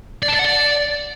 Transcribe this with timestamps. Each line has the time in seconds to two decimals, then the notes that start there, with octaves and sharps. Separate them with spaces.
0.23 D5
0.28 A5
0.34 D5
0.39 F#5
0.45 D5